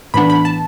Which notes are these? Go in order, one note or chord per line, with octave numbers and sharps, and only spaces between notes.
A2 E3 B3 D4 B5
B5
A5